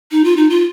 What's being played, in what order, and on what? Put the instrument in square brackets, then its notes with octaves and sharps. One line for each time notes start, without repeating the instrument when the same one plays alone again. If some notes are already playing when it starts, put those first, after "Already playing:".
[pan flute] D#4
F4
D#4
F4